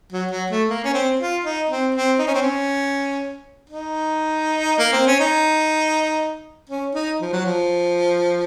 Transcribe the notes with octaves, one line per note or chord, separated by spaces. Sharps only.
F#3
F#3
A3
A#3
C#4
C4
F4
D#4
C4
C4
D#4
C#4
C4
C#4
D#4
A#3
C4
C#4
D#4
C#4
D#4
F3
F#3
F3